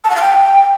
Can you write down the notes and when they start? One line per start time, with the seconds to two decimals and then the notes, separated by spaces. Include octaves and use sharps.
0.04 A5
0.10 F#5
0.15 F5
0.21 G5